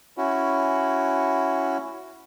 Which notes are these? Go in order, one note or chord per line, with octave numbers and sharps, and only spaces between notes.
C#4 E4 F#4